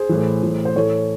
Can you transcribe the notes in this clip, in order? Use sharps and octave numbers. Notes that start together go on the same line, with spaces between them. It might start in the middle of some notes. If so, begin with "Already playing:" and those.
Already playing: G#4 C5
A2 E3
A2 E3
C5
A2 E3 A4 C#5